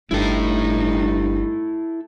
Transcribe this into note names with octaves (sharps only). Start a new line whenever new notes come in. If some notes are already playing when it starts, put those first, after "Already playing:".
G1 G2 A3 D#4 E4 A4